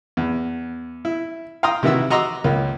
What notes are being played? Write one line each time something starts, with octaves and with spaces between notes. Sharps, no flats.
E2
E4
F5 G5 A#5 C6 D#6
C3 D#3 E3 E4 F#4 E6
F#4 D#5 A#5 C6 D6 E6
C#2 A#3